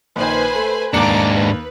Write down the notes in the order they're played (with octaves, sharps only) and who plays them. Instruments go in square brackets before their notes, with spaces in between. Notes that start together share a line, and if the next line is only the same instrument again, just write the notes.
[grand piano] A#1 D#3 [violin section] B4 C5 G#5
[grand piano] A3
[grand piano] D#2 C#7 F#7 [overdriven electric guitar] G#2 D4 [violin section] A#5 D6
[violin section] B4